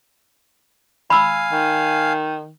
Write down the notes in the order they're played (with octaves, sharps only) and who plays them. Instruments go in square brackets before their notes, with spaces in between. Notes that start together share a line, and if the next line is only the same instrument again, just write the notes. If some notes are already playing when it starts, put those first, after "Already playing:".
[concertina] F5 G#5 [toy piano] B5 E6
[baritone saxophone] D#3